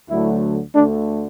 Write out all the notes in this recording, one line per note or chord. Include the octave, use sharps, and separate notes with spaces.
D2 D3 F#3 A3 E4
D2 D3 A3 D4